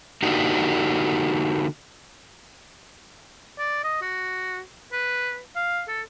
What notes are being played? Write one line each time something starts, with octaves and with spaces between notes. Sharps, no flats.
D3 A#3 D4 D#4 F#4 G4
D5
D#5
F#4
B4
F5
A4